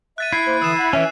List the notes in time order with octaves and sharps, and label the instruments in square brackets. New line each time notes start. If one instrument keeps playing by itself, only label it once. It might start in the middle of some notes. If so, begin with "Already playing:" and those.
[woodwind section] E5 [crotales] F#6 A6 D#7
[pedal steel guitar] E4 [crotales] C7
[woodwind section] A#3 C5
[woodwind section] D3 E3 D#6 [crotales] E6 E7
[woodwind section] F#5 B5
[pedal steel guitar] E3 C#4 [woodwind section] E5